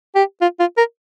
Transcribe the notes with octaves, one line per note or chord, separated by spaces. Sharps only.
G4
F4
F4
A#4